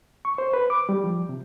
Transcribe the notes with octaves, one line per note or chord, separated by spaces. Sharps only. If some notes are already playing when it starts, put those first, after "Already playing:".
C#6
C5
B4
D6
G3
F3
C3